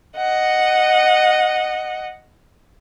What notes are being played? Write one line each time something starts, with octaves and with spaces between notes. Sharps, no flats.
D#5 F#5